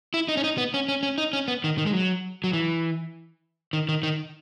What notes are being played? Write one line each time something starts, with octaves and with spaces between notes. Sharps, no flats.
E4
D#4
C#4
D#4
B3
C#4
C#4
C#4
D#4
C#4
B3
D#3
D#3
G#3
F#3
F#3
E3
D#3
D#3
D#3